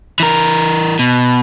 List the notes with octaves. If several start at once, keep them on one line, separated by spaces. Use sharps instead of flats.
E3 A#4
B2